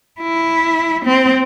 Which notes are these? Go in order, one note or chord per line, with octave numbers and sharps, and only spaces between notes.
E4
C4